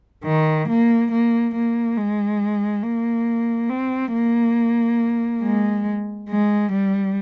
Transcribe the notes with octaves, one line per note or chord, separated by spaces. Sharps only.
D#3
A#3
A#3
A#3
G#3
A#3
C4
A#3
G#3
G#3
G3